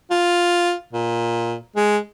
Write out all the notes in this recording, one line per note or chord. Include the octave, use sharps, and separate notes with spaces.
F4
A#2
G#3